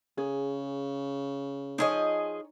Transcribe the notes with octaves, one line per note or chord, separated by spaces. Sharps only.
C#3 G#4
F3 D#4 G#4 C#5 D#5